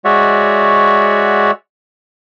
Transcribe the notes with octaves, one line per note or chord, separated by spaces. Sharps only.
G#3 F#4 C#5 D5 E5 F#5